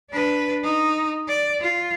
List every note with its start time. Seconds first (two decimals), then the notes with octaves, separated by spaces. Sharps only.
0.10 D4 B4
0.63 D#4
1.28 D5
1.61 F4